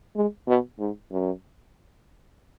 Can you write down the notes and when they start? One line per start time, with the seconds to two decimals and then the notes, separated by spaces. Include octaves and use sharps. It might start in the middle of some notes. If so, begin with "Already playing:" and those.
0.16 G#3
0.47 B2
0.79 G#2
1.11 F#2